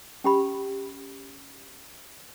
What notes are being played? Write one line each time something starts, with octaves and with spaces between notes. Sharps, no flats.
C#4 G4 B5